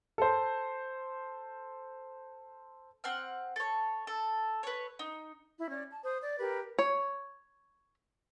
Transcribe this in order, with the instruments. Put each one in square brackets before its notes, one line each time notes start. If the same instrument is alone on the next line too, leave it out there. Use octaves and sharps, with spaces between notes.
[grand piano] A4 C5
[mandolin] C4 F#5 F6
A4 C#5
A4
B4 C#5
D#4
[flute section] E4
C#4 D5
A5
C5 D#6
D5
G4 A#4 B4
[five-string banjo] C#5